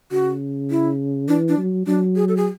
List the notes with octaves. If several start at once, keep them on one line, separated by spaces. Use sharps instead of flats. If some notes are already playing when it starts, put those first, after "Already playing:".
C#3 F#4
E4
E3 D4
D4
F#3
F#3 D4
G#4
A4
G#4